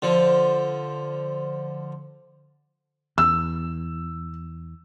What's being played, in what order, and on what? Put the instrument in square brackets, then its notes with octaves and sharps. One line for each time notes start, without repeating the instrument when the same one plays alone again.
[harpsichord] D3 F3
[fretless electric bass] E2 [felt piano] E6